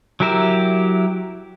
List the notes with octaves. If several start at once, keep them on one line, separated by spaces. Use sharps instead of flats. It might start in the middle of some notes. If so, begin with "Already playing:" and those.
F#3 E4 G4 A#4 E5